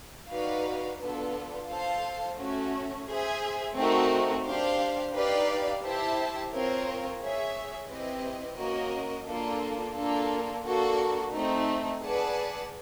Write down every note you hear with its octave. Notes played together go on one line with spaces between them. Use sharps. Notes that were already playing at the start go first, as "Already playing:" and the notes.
D#4 F#4 B4 D5 F5
B3 D4 F4 A4
F4 A4 C5 F5 A5
A3 C#4 F#4
G#4 C5 E5
A3 C4 D#4 F#4 A#4
D4 G4 C5 F5
D#4 G4 B4 D5 F5
E4 G4 C5 E5 A5
C4 F4 A#4 C#5
G#4 C#5 E5
C4 E4 G4 B4 D#5
A#3 C#4 F#4 A#4 D#5
A#3 D4 F4 A4
A#3 D4 F4 A4
A#3 D4 F#4 A4
A3 C4 D#4
G#4 B4 D5 F#5 A5